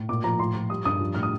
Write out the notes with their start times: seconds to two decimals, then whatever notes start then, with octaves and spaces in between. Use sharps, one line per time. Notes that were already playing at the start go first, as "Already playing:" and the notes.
Already playing: A2
0.09 A#2 D6
0.24 F3 A#5
0.39 A2 C6
0.55 F3
0.70 G3 D#6
0.85 G2 D#6
1.00 F3
1.14 A2 F6
1.23 D#6